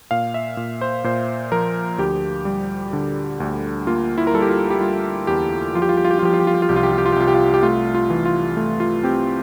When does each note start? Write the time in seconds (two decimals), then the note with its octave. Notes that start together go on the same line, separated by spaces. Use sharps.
0.11 A#2 F5
0.34 E5
0.57 A#2
0.81 C5
1.04 A#2 C5
1.52 F3 A#4
1.98 D2 G4
2.45 G3
2.93 D3
3.40 D2
3.87 A#3 F4
4.18 E4
4.27 A#4
4.34 G3 A4
4.42 G4
4.49 F4
4.70 G4
4.80 G3 F4
5.27 E2 G4
5.74 F3 F4
5.82 G4
5.89 F4
5.97 G4
6.05 F4
6.11 G4
6.19 F4
6.23 F3 G4
6.34 F4
6.40 G4
6.47 F4
6.54 G4
6.62 F4
6.69 C2 G4
6.76 F4
6.83 G4
6.92 F4
6.98 G4
7.06 F4
7.12 G4
7.16 C2 F4
7.28 G4
7.34 F4
7.54 G4
7.62 A3 F4
7.95 F4
8.10 E3
8.25 F4
8.57 A3
8.80 F4
9.03 C4 G4